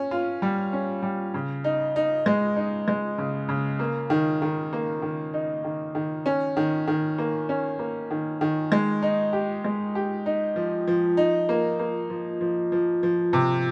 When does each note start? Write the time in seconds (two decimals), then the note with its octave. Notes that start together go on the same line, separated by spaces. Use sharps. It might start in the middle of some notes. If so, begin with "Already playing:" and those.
Already playing: C#4
0.11 F4
0.42 G3
0.73 C#4
1.03 G3
1.34 C#3
1.64 D#4
1.96 D#4
2.26 G#3
2.56 D#4
2.88 G#3
3.18 C#3
3.49 C#3
3.79 A#3
4.10 D#3
4.42 D#3
4.73 A#3
5.02 D#3
5.34 D#4
5.64 D#3
5.95 D#3
6.26 C#4
6.57 D#3
6.87 D#3
7.18 A#3
7.49 C#4
7.79 A#3
8.11 D#3
8.41 D#3
8.72 G#3
9.02 D#4
9.33 G4
9.64 G#3
9.95 G4
10.26 D#4
10.56 F3
10.88 F3
11.17 D#4
11.49 A#3
11.79 A#3
12.10 F3
12.41 F3
12.72 F3
13.03 F3
13.33 C3